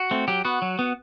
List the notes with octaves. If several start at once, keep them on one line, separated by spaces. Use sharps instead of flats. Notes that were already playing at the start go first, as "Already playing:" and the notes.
Already playing: F#4
A3 C4
F#3 G4
B3 F#4
F#3
B3